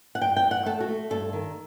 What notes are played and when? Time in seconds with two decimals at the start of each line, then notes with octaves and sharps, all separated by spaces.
0.15 F#5
0.21 G2 G5
0.36 G5
0.44 G2
0.51 F#5
0.66 A3 A4
0.80 F#4
0.88 A3
1.10 G2 A4
1.33 D#3